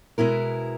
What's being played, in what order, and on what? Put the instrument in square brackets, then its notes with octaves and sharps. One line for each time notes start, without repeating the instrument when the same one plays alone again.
[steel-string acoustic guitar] B2 G#3 B3 E4 A#4